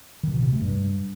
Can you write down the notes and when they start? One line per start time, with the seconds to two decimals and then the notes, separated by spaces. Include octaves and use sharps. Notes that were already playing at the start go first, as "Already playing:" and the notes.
0.23 D#3
0.33 B2
0.42 C3
0.52 A3
0.61 G2